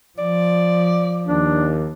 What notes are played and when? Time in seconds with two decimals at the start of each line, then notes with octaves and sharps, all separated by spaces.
0.18 F3 D5
1.28 D#2 D4